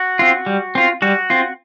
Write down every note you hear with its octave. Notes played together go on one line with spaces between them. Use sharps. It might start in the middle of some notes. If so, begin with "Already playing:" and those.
Already playing: F#4
C4 F4
G3
C4 F4
G3 F#4
C4 F4